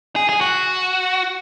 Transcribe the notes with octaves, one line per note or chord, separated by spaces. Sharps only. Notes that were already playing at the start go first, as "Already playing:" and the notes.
G#4
G#4
F#4